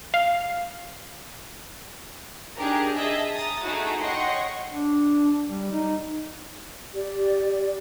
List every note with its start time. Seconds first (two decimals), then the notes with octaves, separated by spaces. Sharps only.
0.14 F5
2.56 D4 D#4 G4 G#4 A#4
2.95 G#4 D#5 E5 A5
3.31 A#5 D#6 A6
3.64 A3 D#4 E4 F#4 G#4
3.99 C#5 D#5 F#5 G5 C6 C#6
4.71 D4
5.47 G3
5.72 D#4
6.93 G4 D5